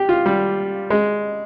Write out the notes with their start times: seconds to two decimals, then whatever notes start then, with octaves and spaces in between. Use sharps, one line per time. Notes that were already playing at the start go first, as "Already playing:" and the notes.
Already playing: G4
0.09 F4
0.26 G3
0.90 G#3